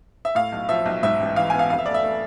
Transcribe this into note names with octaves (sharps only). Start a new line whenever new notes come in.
E5
A2 F5
B1
F3 E5
B1
G#2 E5
A1
E3 F5
G#5
B3
F5
F1 F5
E5
A3 D5
E5
A3